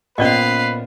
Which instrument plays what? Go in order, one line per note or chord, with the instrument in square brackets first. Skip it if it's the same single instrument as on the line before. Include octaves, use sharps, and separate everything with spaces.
[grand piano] A#2 B3 [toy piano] C#4 D5 D#5 [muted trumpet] B4 [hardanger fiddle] C5 F5